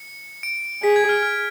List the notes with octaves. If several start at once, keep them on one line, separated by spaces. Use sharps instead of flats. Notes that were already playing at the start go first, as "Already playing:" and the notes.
Already playing: C#7
D7
G#4 B6
G#6
F6
F6